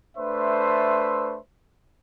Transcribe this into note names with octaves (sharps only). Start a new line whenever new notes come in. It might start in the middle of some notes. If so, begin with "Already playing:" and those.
A3 D4 B4 C5 E5 C6